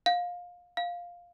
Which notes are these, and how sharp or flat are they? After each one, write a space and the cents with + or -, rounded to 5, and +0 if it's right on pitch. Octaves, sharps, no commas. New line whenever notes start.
F5 +20
F5 +5